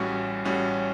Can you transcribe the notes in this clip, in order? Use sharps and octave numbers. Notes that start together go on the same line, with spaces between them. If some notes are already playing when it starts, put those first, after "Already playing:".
Already playing: A1 A2 G3 C#4 F#4
A1 A2 G3 C#4 F#4